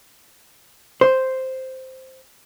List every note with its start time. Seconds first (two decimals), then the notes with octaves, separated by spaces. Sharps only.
1.01 C5